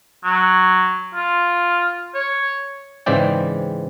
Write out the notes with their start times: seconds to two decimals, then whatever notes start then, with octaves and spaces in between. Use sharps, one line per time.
0.25 F#3
1.15 F4
2.14 C#5
3.06 G#2 C#3 E3 C4 D5 G5